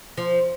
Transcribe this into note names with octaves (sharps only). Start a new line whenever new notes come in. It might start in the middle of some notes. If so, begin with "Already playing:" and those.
F3